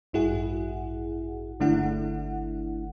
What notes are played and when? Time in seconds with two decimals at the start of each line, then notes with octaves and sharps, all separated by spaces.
0.13 A1 G2 E4 F#4 G#4 F#5
1.60 G1 D3 A3 D4 E4 F#5